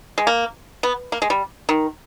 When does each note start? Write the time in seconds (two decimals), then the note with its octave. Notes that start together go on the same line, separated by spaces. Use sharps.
0.18 G#3
0.27 A#3
0.83 B3
1.12 A#3
1.22 G#3
1.30 G3
1.69 D#3